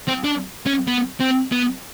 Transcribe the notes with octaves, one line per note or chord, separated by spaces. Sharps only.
C4
D4
C#4
B3
C4
B3